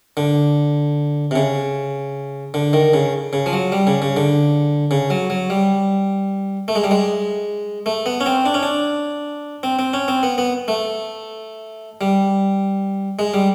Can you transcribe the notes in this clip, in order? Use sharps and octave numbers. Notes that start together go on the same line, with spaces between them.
D3
C3
C#3
D3
D#3
C#3
C#3
F3
F#3
G3
C#3
C#3
D3
C#3
F#3
F#3
G3
A3
G#3
G3
G#3
A3
B3
C#4
C4
D4
C#4
D4
C4
C4
C#4
C4
B3
B3
A3
G3
G#3
G3